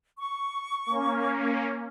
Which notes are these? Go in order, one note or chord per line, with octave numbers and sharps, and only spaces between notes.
C#6
A#3 C#4